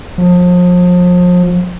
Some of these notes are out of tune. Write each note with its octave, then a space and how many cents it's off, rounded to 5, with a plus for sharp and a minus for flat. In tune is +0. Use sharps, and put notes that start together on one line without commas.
F3 +35